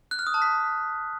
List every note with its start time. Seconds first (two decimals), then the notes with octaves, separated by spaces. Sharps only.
0.11 F#6
0.19 F6
0.27 D#6
0.34 A5
0.42 B6